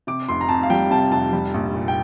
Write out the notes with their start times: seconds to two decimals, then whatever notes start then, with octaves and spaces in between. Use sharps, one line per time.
0.07 C3 D6
0.29 F1 C6
0.41 A#5
0.49 F2 A5
0.63 F5
0.70 G3 G5
0.91 C3 A5
1.12 F1 A5
1.33 G3
1.54 A#1
1.74 A#2
1.88 G5